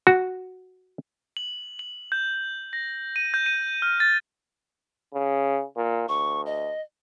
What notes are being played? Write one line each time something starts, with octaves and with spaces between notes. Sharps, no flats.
F#4
F#7
F#7
G6
A#6
D#7
G6
D#7
F6
A6
C#3
A#2
D2 C#6
D#5